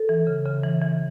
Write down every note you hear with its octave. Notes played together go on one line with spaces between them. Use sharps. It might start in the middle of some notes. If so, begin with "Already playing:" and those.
Already playing: A4
E3
C#3
C#3
E3
E3